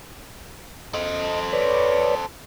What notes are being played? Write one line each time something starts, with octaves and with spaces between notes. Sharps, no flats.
A4 C5 D#5
B4 C#5 D5